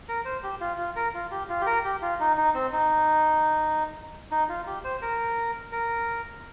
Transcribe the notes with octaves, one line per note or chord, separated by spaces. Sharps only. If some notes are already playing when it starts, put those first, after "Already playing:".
A#4
C5
G4
F4
F4
A#4
F4
G4
F4
G4
A#4
G4
F4
D#4
D#4
C4
D#4
D#4
F4
G4
C5
A#4
A#4